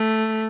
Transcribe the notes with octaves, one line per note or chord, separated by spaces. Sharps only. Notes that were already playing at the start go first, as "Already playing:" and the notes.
Already playing: A3